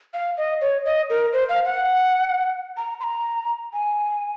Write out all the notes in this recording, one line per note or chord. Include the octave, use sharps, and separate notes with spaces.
F5
D#5
C#5
D#5
A#4
C5
F5
F#5
A#5
C6
A#5
G#5